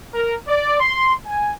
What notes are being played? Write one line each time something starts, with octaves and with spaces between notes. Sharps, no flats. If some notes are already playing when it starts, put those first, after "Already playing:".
A#4
D5
C6
G#5